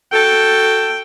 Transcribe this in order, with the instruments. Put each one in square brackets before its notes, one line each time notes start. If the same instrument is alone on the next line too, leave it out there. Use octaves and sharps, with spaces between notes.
[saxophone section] F#4 A4 [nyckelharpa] G5